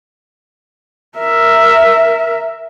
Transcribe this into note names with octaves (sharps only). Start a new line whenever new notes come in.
A#4 E5